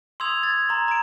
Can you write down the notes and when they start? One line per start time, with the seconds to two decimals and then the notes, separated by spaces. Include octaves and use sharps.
0.20 C6 D#6 E6 G#6 F7
0.43 G#6 A6
0.69 A#5 C6
0.88 A#5 D7